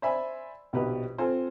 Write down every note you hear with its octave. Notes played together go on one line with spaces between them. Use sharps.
C5 D5 E5 G#5 B5
A#1 B2 D#4 G4 B4
C4 F4 A4 C5 G#5